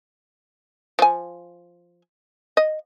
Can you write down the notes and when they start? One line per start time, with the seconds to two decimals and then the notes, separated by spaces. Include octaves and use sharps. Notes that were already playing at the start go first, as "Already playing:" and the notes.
0.99 F3 G#5
2.57 D#5